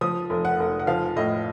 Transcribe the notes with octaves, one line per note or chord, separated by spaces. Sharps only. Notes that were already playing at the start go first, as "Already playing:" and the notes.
F3 D#6
F1
F#5
F1
F#5
F3 F5
A2 D#5